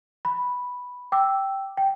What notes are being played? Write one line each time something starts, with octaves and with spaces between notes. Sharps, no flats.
B5
G5 D6 E6
G5